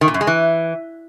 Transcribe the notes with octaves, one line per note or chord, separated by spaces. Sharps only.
D#3
A#2
F#2
G#3
E3